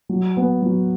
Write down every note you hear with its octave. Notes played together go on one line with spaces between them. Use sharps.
F#3
B3
F#3